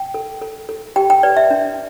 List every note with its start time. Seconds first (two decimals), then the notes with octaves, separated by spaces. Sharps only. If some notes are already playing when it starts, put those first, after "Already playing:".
Already playing: G5
0.14 A4
0.42 A4
0.69 A4
0.96 G4 G5
1.10 G5
1.23 B4 D5
1.37 E5
1.51 D4